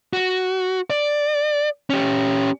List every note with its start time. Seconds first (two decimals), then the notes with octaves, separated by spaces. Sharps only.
0.13 F#4
0.90 D5
1.90 C#4 G4